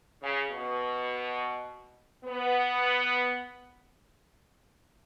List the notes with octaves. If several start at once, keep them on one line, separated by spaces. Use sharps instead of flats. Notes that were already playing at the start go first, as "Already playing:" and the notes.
C#3
B2
B3